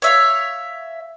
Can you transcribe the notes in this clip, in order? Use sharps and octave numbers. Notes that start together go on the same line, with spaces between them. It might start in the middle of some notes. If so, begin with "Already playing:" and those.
C#5 E5 F5